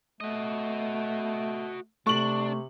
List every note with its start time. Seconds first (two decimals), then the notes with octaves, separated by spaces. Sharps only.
0.21 A3 F#4 D#5
2.07 C3 A3 D4 C#6 F#7